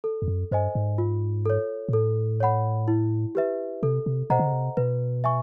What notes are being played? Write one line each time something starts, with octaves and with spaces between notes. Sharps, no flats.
A4
F2
F#2
G2 C5 D#5 G#5
G#2
F4
A4 C#5
A#2
A2 A4
C#5 F#5 B5
E4
G4 B4 E5
C3 A4
C3
B2 C5 D#5 F#5 A#5
D3
C#3
C3
B2 B4
E5 G#5 C#6